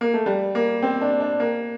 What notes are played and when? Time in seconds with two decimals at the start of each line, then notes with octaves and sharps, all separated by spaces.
0.01 A#3
0.14 A3
0.26 G3
0.55 A#3
0.82 C4
1.01 D4
1.20 D4
1.40 A#3